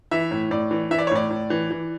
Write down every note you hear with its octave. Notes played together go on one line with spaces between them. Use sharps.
E3 E5
A2
A2 D5
E3
E3 E5
D5
C#5
A2 D5
A2
E3
E3